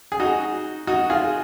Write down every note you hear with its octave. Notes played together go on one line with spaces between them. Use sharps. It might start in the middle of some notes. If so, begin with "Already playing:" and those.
G#4
D#4 F#4
D#4 F#4
F4 G#4